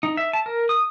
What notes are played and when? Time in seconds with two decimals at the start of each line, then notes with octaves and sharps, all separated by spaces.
0.03 D#4
0.17 E5
0.33 A5
0.46 A#4
0.69 D#6